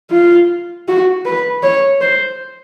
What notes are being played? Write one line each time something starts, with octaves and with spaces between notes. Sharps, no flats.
F4
F#4
B4
C#5
C5